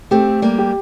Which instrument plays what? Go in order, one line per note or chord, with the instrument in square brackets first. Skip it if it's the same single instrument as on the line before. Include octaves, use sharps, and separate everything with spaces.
[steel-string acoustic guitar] A3 C4 [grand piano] G4
[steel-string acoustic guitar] G3 A#3
[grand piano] G4